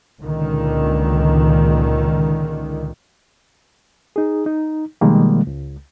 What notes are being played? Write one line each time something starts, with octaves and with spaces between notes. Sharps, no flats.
C#2 A#2 D3 D#3
D#4 G#4
D#4
B2 D#3 F3 G3 G#3 A#3
C#2